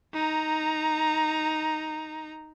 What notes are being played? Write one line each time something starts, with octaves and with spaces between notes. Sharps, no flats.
D#4 A#5